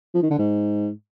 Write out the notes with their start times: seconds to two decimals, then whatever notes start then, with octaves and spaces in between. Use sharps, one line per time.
0.14 F3
0.22 D#3
0.30 D3
0.38 G#2